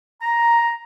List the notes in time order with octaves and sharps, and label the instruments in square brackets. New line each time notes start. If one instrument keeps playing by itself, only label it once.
[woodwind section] A#5